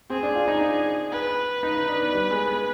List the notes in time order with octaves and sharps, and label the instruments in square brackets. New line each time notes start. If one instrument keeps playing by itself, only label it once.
[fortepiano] C4 [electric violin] G#4
[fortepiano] D4
F4
D#4
D4
[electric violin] B4
[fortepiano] D#4
D#4
D4
B3
G3
G#3
B3